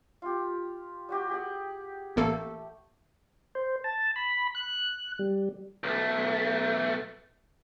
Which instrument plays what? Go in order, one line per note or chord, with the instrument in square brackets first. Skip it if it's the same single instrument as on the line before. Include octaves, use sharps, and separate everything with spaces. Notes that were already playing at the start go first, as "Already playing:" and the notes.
[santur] F4 G4
G3 F#4 G4
G4 G#4 F#5
[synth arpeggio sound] A1 A#3 A4 [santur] A3
[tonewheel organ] C5
A5
B5
F#6
G3
[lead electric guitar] B1 A3